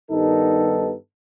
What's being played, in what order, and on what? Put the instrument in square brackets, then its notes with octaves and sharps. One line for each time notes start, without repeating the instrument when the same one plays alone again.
[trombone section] G2 D#3 G3 B3 D#4 A4